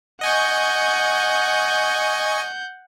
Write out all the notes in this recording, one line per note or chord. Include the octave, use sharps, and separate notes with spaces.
D#5 F#5 G#5 C#6 G6